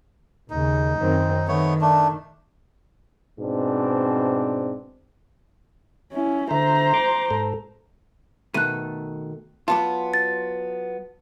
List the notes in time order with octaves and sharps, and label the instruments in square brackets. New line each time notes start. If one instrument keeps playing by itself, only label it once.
[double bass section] D#2 C#3 [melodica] D#4
[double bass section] F#2 D#3 C4
[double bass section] D#3 [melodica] A3 B3 C#5
[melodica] A3 D4
[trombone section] G#2 B2 C4 D4
[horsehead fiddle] C#4 E4
[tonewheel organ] D3 E5 [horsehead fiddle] C5 A#5
[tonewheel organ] C6 D6
G#2 A4
[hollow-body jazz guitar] B2 D#3 A3 [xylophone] F#6 D#7
[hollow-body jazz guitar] F#3 B3 F4 [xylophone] A5 D6
[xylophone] A6